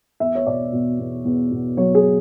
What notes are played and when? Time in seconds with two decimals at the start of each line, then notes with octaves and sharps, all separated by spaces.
0.20 E2 E5
0.35 C#5
0.46 B2 D5
0.73 B2
0.99 E2
1.25 E2
1.51 B2
1.77 F#3 C#5
1.95 G#4